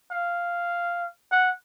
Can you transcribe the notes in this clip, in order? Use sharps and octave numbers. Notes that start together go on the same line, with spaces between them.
F5
F#5